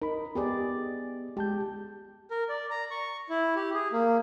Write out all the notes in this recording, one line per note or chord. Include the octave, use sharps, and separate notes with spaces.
D#4 A#4 B5
B3 G4 G#4 D5
G#3 G4 A5 G6
A#4
D5
A#5
C#6
E4
G4
G#4
A#3